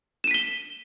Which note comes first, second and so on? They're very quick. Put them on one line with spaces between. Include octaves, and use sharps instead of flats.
E7 D#7 B6 G7